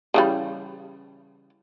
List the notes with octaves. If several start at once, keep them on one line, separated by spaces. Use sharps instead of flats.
C#3 E3 G3